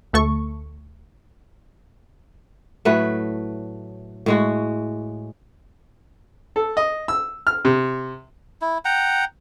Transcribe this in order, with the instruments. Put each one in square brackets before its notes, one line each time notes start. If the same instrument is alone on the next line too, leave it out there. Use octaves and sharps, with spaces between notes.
[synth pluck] D2 A3 A4 C#6
[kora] A2 F#3 A3 B4
A2 G#3 F#4
[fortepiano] A4
D#5
E6
F6
C3
[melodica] E4
F#5 G5 A#5